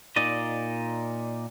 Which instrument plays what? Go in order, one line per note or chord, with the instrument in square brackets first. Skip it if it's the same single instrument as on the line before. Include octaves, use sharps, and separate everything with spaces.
[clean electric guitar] A#2 D#4 D5 D#5